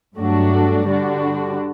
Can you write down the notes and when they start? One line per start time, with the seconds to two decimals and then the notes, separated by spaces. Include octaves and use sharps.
0.17 G2 F#3 A3 D4 F#4
0.86 D3 G3 D4 F#4